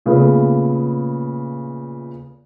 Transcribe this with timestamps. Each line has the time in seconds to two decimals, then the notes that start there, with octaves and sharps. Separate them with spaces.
0.06 A#2 C#3 A3 B3